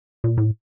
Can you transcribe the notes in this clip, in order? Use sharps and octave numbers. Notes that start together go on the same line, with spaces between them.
A#2
A2